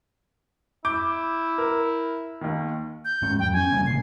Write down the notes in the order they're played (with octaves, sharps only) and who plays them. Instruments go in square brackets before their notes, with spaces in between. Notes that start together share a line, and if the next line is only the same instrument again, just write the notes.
[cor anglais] E4 [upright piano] D6 G6
[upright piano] A#4
D#2 D#3
[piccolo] G6
[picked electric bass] G#2 G#3 C#4
[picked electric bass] F2 F#3 [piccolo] G5
[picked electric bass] C4 C#4 [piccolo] G#5
[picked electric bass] C3 G3 A#3
[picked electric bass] A1 C#3 [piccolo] C7